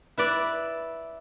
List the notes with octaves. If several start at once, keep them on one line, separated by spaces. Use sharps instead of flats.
E4 B4 D5